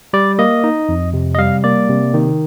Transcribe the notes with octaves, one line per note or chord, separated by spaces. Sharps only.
G3 D5
A#3 D#5
D#4
F2
C3
D#5
G3 F5
A#3 D5
C3
D#3